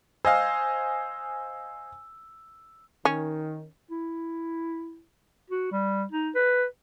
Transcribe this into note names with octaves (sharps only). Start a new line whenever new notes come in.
C5 D#5 F5 G#5 E6
D#3 C#4
E4
F#4
G3
D#4
B4